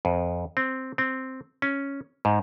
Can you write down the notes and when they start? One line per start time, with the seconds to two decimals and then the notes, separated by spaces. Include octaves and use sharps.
0.05 F2
0.57 C4
0.98 C4
1.62 C#4
2.25 G#2